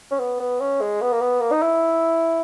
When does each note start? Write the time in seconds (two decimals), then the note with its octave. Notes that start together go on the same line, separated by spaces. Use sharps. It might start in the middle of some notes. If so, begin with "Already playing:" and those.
0.11 C#4
0.19 B3
0.40 B3
0.61 C#4
0.81 G#3
1.01 B3
1.12 A#3
1.21 B3
1.41 A#3
1.52 D#4
1.62 E4